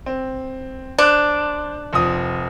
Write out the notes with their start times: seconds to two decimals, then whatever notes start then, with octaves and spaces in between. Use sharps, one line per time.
0.06 C4
0.98 D4 C5 F#6
1.93 F1 F3 D#6